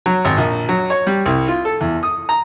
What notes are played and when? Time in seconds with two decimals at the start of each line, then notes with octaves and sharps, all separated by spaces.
0.06 F#3
0.25 G#1
0.38 A#1
0.69 F#3
0.90 C#5
1.07 G3
1.26 C2
1.48 F4
1.65 A4
1.81 E2
2.03 D#6
2.29 A#5